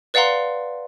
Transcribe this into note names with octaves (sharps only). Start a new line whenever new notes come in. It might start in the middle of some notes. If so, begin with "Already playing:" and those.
B4 D5 F5 F#5 A#5 C6